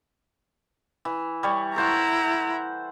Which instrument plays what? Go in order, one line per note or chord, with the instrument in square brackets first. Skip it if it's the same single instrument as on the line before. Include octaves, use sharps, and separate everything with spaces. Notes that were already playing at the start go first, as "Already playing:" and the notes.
[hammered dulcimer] E3
G3 C#5
[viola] E4 A#5 [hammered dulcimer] A4 C5 F#5